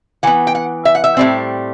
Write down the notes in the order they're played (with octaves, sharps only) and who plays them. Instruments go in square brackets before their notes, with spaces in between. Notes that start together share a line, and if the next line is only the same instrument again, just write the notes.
[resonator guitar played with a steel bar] E3 B3 F#5
G5
F#5
E5
F#5
E5
A2 G3 C4